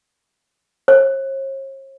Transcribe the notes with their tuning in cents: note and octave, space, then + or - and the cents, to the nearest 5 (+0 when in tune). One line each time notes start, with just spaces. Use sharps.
C#5 -45